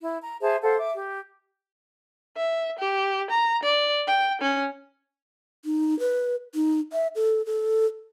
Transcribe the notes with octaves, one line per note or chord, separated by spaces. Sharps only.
E4
A#5
G#4 C5 E5 A5
A4 C5 F5 F#5
E5 D6
G4
E5
G4
A#5
D5
G5
C#4
D#4
B4
D#4
E5
A4
A4